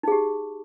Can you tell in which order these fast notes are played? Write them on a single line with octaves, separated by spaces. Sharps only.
D#4 G#4 G4